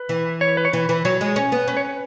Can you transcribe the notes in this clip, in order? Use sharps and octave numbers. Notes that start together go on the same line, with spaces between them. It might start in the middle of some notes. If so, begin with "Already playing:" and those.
Already playing: B4
E3
C#5
B4
C#5
E3 B4
E3
F#3 C#5
G#3
C#5
C#4
B3
C#4 B4
C#5
B4